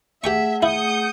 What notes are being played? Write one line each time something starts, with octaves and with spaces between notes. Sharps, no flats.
A3 G4 G#4 E5 F#5 G5 C#6
E4 D#6 G6 C#7